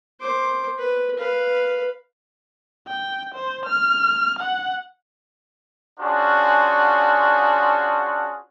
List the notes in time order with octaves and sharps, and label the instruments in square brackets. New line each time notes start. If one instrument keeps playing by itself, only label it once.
[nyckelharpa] C5 D6
B4
B4 F5
[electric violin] G5
C5
F6
F#5
[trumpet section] C#4 D4 F4 F#4 G#4 C5